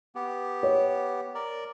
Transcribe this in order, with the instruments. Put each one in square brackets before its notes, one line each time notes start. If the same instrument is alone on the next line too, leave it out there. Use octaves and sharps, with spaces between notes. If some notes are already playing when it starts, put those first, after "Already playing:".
[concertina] B3 G4
[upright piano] C#5
[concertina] A#4 D5